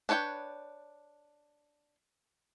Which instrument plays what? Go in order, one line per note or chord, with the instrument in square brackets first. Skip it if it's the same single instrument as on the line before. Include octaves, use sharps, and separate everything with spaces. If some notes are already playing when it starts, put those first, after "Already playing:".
[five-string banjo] D4 B4 C#5 F#5 G5